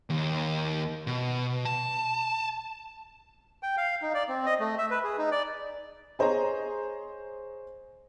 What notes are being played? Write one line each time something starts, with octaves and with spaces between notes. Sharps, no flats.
D#2
B2
A5
G5
F5
D#4
D5
C4
D#5
A3
E5
B4
G#4
D#4
D5
G#4 C5 C#5 D#5 A#5